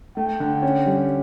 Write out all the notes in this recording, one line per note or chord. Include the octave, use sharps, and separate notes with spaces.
A3 G5
D3
C#4
G3